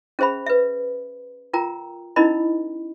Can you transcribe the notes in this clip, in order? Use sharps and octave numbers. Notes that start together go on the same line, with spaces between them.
C#4 G#4 C5 E5 B5
B4 E5
F4 A#4 G5 A#5
C#4 D#4 E4 A#4 D#5 B5